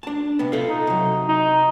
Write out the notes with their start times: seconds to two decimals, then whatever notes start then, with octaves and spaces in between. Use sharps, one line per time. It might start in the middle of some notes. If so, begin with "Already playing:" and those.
0.03 D4 A5
0.39 C3 B3
0.52 F4 A4 F5
0.69 D#4
0.87 C3 F#3
1.29 D#4